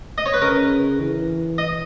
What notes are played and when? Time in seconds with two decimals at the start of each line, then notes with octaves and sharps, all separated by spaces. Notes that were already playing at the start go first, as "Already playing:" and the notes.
0.18 D#5
0.26 C#5
0.34 B4
0.41 C#3 A#4
1.00 E3
1.58 D#5